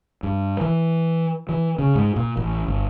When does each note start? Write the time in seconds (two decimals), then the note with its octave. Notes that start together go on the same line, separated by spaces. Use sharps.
0.23 G2
0.61 E3
1.49 E3
1.79 C#3
1.95 G#2
2.16 A#2
2.37 A1
2.66 G1